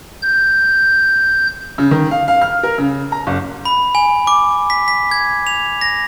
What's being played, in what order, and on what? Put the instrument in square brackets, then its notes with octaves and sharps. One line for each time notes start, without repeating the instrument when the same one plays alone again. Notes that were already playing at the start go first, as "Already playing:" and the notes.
[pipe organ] G6
[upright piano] C#3
D#3
F5
F5
F6
A#4
C#3
A#5
F#1
[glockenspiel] B5
G#5
D6
B6
B6
G#6
F7
A#6